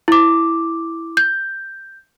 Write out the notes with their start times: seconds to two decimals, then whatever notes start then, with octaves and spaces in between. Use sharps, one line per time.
0.08 E4 D6
1.17 G6